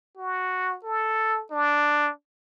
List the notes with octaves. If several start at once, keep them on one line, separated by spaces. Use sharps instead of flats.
F#4
A4
D4